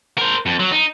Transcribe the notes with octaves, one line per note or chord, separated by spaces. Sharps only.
A#4 C5
F2
F#3
D#4